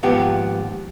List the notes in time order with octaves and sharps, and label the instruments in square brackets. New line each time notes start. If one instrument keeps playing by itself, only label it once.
[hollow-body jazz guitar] D#2 G#2 F3 B3 G4 G5